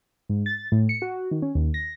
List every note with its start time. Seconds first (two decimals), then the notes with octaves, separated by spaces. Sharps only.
0.29 G#2
0.46 A6
0.72 A2
0.89 C#7
1.02 F#4
1.31 D#3
1.42 C#4
1.55 D#2
1.74 A#6